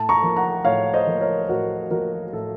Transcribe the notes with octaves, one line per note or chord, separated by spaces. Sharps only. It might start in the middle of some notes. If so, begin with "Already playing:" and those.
Already playing: A2 A5
A#5 C#6
F3 A#3
F#5 A#5
A2 C#5 F5
C5 D#5
F3 A#3
A#4 C#5
A2 F#4 A#4
F3 A#3 F#4 A#4
A2 A4